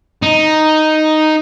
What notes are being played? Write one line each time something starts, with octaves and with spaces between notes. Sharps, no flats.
D#4